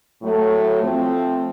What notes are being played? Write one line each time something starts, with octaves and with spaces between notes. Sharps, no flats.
A2 F#3 A3
F3 A3 C4